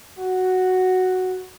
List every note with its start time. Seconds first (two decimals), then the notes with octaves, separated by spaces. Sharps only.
0.19 F#4